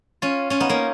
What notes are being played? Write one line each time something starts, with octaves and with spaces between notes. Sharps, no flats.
C#4 F4
C#4 F4
B3 D#4
A#3 C#4